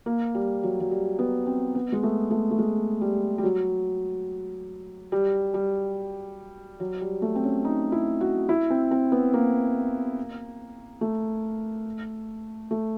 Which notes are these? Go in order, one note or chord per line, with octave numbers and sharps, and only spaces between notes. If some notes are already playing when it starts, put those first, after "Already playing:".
A#3
G3
F#3
F#3
G3
B3
C4
B3
G#3
A3
A3
A3
G#3
G3
G3
F#3
G3
G3
F#3
G3
A3
C4
C#4
D#4
E4
F#4
E4
C4
C4
B3
A#3
A3
A3